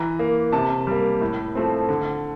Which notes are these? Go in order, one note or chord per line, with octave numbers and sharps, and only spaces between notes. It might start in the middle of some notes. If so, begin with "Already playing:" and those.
Already playing: E3 A#5
A#3
C3 A5
G3 A#3
A2
F3 A3 C4
D3